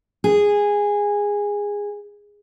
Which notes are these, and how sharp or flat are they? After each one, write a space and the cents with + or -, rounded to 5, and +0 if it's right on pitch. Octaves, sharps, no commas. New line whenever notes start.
G#4 -15